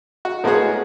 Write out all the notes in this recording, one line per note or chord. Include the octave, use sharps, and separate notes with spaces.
F#4
A2 G#3 A#3 B3 F#4 G#4